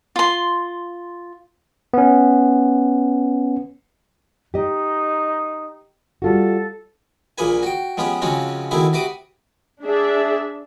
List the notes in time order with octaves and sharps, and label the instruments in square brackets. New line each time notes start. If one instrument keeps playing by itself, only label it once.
[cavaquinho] F4 C6
[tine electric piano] B3 C#4
[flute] D#4 [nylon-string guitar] G4 D#5
[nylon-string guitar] G3 F4 F#4 [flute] A4
[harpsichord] A#1 A#2 A#3 G#4 B4 G#5
F#4 G5
F3 G#3 B3 C#4 G4
C#3 F3 G#3 C4 C#4 F#4
B2 D#3 A3 C4 E4 G#4
C3 F#4 B4 D6 D#6
[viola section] D4 G#4 E5